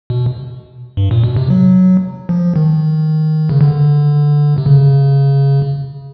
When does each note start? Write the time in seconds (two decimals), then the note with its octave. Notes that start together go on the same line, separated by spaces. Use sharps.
0.10 B2
0.97 G2
1.11 A#2
1.24 B2
1.36 C3
1.50 F#3
2.29 F3
2.56 D#3
3.49 C#3
3.61 D3
4.58 C3
4.66 C#3